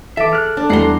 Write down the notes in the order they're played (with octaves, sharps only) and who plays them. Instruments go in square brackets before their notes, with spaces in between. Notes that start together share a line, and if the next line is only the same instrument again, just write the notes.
[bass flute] E3 [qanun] A4 [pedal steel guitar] E5 D6
[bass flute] G#4 [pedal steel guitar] F6 F#6
[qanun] D4 [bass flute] A4
[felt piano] E2 G3 C7 [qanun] F#5 A#5 C6